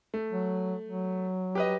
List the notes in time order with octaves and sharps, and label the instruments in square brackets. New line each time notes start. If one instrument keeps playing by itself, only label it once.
[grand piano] A3
[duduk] F#3
F#3
[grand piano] G4 B4 D#5